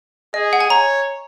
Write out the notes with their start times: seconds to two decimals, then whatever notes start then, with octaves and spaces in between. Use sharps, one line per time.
0.34 G#4 D#5
0.53 F#5
0.60 G#5
0.70 C#5 A#5